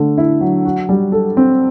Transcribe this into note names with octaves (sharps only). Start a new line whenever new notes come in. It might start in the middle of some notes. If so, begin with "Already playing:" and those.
Already playing: D3 A3
E4
F#3
F#4
G3
A4
C4